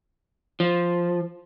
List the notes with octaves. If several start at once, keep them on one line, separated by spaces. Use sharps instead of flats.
F3